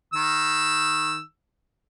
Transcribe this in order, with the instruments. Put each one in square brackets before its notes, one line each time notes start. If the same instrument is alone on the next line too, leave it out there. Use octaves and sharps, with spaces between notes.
[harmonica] D#3 E6